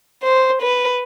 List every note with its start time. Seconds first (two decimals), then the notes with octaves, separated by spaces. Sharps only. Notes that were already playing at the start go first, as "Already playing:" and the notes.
0.23 C5
0.62 B4